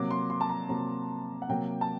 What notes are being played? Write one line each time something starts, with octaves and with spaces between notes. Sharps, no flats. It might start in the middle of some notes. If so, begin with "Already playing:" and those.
Already playing: C3 F#3 A#3 D6
C6
C6
A5
A#5
C3 F#3 A#3 A#5
F#5
C3 F#3 A#3 G5
A5